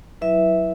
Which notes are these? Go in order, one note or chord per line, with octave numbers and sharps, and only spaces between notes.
F#3 E4 B4 E5